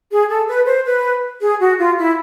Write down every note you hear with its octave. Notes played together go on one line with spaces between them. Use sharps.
G#4
A4
B4
C5
B4
G#4
F#4
F4
E4